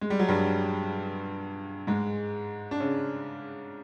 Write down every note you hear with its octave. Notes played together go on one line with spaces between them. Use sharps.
G#3
G3
F#3
G2 G3
G#2 G#3
D4
C#3 C#4